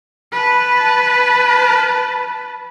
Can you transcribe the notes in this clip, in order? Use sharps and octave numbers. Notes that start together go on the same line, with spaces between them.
B4 A5